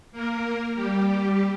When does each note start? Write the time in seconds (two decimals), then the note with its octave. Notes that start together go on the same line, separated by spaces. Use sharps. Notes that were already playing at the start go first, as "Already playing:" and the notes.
0.12 A#3 A#4
0.75 G3 G4